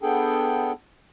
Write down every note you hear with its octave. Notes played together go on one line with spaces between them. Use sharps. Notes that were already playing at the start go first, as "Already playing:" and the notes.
B3 D4 G#4 A4 G5